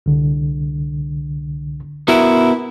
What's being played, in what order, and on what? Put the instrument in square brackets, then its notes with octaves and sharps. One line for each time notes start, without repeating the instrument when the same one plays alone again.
[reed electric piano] C2 D3
[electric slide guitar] B3 F#4 A#4 [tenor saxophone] E4